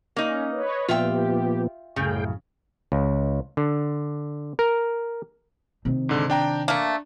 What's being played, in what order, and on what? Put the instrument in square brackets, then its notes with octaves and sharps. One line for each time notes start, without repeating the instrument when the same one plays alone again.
[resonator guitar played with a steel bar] A#3 D#4 [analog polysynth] C#4
[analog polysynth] B4 C#5 D#5
[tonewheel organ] A#2 F3 B3 [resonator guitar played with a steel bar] F4 E5 G5
[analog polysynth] G4
[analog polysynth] C2 F#2 A2 [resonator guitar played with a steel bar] C#3 [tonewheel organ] G#4 G5
[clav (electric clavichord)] C#2
D3
A#4
[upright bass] C3 D#3
[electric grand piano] G#2 D3
D4 G5 A#5
[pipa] A3 A#3 [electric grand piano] D4